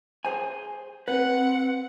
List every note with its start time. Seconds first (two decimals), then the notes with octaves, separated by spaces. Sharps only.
0.25 G#4 C5 G#5
1.08 C4 B4 F#5